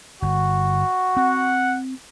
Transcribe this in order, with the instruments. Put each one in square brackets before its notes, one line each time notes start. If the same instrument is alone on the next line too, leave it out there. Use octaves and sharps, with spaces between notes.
[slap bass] G1 [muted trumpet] F#4
[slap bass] C4 [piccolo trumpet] F#5